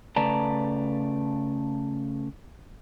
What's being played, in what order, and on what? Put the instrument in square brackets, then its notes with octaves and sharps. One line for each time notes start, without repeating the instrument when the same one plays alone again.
[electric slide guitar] C#3 A3 B4 D5 A5 A#5